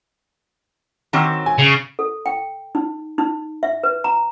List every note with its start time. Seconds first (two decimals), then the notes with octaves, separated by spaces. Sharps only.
1.13 D#3 F#3 C4 A#5 D6 E6
1.46 G#5
1.59 C#3
1.99 A4
2.26 G5
2.75 D#4
3.18 D#4
3.63 E5
3.83 B4
4.04 A#5